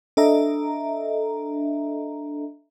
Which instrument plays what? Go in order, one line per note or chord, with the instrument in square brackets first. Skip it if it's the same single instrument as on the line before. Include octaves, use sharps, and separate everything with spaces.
[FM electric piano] D4 A4 D#5 E5 A#5